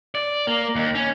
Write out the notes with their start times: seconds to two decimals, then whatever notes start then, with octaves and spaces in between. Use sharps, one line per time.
0.15 D5
0.47 A#3
0.75 D#2
0.95 C#4